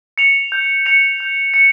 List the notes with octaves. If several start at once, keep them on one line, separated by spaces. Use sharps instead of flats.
C#7 F7
G6
C#7 F7
G6
C#7